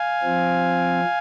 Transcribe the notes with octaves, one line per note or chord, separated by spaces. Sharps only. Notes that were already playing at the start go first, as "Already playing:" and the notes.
Already playing: F5 G#5
F3 C4